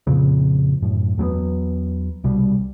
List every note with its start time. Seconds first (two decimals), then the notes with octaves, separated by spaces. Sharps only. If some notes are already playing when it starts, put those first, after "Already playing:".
0.07 F2 A#2 C#3 C4
0.82 F#2 A2
1.18 E2 F#3 A3 B3
2.24 C2 B2 G3